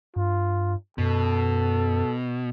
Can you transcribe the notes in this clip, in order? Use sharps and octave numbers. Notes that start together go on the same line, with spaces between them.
G2 F4
F#2 B2 A4